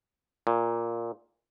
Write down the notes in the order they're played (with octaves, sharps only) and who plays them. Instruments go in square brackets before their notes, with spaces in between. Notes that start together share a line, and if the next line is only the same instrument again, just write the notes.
[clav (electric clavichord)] A#2